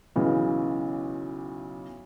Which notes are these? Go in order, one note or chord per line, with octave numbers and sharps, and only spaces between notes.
B1 C#3 E3